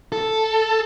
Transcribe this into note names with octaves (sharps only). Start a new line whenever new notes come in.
A4